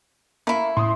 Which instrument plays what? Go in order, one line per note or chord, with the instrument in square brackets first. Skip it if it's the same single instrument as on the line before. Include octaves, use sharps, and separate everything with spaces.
[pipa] A3 E4 [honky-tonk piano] A#3
[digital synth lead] A2 [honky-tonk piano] C6 D#6